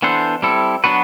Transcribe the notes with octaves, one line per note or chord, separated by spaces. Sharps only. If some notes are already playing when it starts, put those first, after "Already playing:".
E3 B3 D4 A4 C5
G3 C4 E4 A4
F#3 B3 D4 F#4 B4